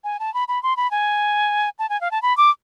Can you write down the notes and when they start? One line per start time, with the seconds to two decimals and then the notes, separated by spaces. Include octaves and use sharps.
0.04 G#5
0.20 A5
0.34 B5
0.48 B5
0.63 C6
0.77 B5
0.91 G#5
1.79 A5
1.89 G#5
2.01 F5
2.11 A5
2.22 B5
2.37 D6